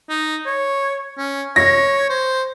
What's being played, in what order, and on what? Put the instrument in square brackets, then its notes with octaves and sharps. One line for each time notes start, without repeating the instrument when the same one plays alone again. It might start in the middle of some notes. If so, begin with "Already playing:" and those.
[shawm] D#4
C#5
C#4
[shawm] C#5 [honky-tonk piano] A#6
[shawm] C5